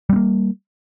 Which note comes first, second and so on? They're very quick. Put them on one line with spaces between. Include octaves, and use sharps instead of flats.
G3 C4 A#3